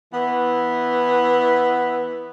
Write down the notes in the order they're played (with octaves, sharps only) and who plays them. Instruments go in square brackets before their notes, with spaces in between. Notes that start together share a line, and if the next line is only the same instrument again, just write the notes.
[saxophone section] E3 B3